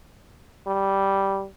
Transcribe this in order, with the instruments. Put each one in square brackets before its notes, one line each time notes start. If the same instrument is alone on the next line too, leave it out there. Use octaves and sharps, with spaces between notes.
[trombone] G3